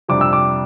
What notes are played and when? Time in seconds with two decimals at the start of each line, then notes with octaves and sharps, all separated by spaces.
0.08 F2 C3 G3 D4 D6
0.21 E6
0.33 D6